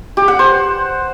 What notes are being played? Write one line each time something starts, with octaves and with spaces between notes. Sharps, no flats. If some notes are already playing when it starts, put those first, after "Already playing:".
G4
F#5
C5